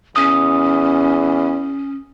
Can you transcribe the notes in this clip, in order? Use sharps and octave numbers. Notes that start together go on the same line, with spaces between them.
E2 C#4 D#6